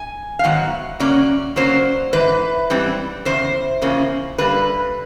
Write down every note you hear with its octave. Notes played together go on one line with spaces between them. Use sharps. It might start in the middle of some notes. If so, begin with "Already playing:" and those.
Already playing: G#5
F5
G#2 D#3 F#3 B3 F#5
C#3 F#3 A#3 C#4 D5
C#3 F#3 A#3 C#4 C5
G#2 E3 B4
G#2 E3 G3 C4
E2 C#3 C5
E2 C#3 F3 A#3 C#4
D3 G3 A#3 B4